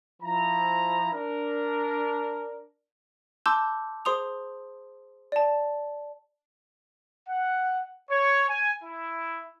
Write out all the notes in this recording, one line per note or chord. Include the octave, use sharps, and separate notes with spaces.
F3 E4 A#5
D4 A#4
A5 C6 D6 E6 G6
G#4 C5 C6 D#6 F7
D5 A5
F#5
C#5
G#5
E4